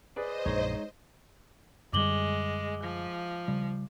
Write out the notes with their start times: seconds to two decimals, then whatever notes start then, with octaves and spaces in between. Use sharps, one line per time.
0.16 G#4 B4 C5 D5 D#5
0.46 A#1 F#2 A#2 G#3 D#4 C#5
1.93 F#2 D3 G3 G#3 D6 F#7 G7
2.83 F3
3.48 C#3 G3